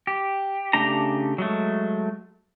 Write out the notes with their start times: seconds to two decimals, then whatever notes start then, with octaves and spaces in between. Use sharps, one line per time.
0.07 G4
0.73 C#3 A3 D4 G4 A#5
1.38 F#3 G#3 A3